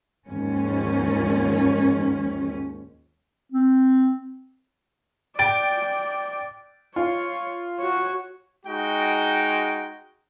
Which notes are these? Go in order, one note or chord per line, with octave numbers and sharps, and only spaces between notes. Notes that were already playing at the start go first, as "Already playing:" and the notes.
D#2 G#2 F3 C#4
C4
D5 G5 A6 D7
F4 C#5
F#4 C#5
G#3 D#4 F#4 G5